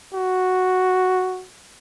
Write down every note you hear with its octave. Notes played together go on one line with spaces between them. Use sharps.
F#4